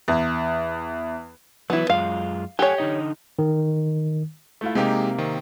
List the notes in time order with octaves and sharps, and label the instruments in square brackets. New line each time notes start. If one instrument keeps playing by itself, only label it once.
[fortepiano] E2
[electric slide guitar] E3 F#3 [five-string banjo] B3 E4
[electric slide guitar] F#2 G#3 F4 [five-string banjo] F5
[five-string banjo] G4 C#5 [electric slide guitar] A4 F#5 G#5
[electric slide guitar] D3 D#4 D#5
[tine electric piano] D#3
[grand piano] A3 E4 F4
[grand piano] C3 A#3 [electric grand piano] G#3 D#4 G4
[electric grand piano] D#3 C4